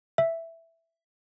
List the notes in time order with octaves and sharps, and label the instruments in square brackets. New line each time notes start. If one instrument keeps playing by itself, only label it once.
[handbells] E5